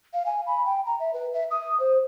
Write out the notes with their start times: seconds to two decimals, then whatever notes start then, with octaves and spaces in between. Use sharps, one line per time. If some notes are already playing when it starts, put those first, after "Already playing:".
0.13 F5
0.26 G#5
0.46 B5
0.66 G5
0.86 A#5
1.00 E5
1.14 B4
1.33 E5
1.51 D#6
1.80 C5